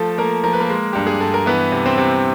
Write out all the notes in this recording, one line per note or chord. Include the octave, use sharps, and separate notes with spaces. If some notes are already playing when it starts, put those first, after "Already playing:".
Already playing: F3 A3 A4
A3 A#3 A#4
F3 A#4
B4
A#3 A#4
G#3
G2 G4
G#4
G2 A4
A#4
E3 B3 B4
C3
C4 C5
C3